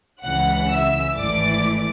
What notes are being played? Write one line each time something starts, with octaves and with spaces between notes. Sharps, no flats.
C#2 C#3 E3 F#5 F#6
E5 E6
G#1 G#2 E3 A3 D5 D6